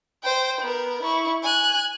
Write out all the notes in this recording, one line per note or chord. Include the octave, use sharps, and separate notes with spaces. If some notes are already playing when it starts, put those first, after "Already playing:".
C5 G5
B3 A#4
E4 C#6
G#5 F#6